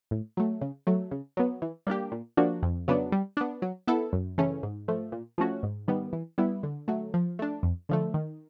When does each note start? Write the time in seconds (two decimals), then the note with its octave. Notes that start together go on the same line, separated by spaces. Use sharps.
0.11 A2
0.37 F#3 A3
0.61 C#3
0.87 F#3 A3
1.11 C#3
1.37 F#3 B3
1.62 E3
1.87 G3 A#3 D4 G4
2.12 A#2
2.37 F3 A#3 D4 F#4
2.63 F2
2.88 C#3 F#3 B3 D4
3.12 G3
3.37 B3 D4
3.62 F#3
3.87 B3 E4 A4
4.13 F#2
4.38 C#3 E3 A3 C#4
4.63 G#2
4.88 F3 A3
5.12 A#2
5.38 F3 A3 C#4 F#4
5.63 G#2
5.88 D#3 G3 B3
6.13 E3
6.38 G3 B3 E4
6.63 D3
6.88 F#3 A3
7.14 F3
7.39 A3 D4
7.63 F2
7.89 D3 F3 A3
8.14 D#3